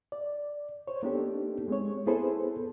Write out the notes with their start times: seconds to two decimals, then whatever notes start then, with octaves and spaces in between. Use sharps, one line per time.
0.12 D5
0.88 C5 C#5
1.03 A#3 B3 D4 D#4 G4 A4
1.68 G#3 C4 C#5
2.06 B3 E4 G#4 A4 B4 C5